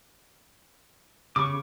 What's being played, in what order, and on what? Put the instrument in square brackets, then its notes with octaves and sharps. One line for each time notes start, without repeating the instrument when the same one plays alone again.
[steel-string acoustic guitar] C#3 [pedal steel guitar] C#6 D6